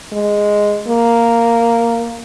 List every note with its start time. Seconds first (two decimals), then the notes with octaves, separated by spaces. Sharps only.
0.12 G#3
0.87 A#3